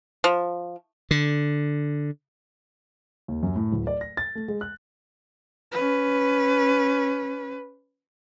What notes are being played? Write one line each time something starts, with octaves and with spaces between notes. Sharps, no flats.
F3
D3
D#2
F#2
A2
D1
D5
A#6
A6
A3
G#3
F#6
C#4 B4